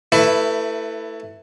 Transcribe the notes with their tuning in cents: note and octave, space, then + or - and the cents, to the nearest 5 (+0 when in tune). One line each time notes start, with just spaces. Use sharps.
A3 +25 E4 +0 B4 +10